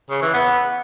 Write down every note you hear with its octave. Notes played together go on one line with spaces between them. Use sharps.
C#3
E3
B3